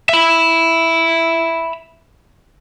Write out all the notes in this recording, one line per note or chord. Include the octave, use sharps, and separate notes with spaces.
E5 B5